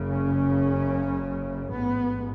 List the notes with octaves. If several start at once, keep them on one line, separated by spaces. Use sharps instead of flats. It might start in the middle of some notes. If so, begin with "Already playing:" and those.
Already playing: F#1 F#2 C#3
C#4
A1 G#2 B3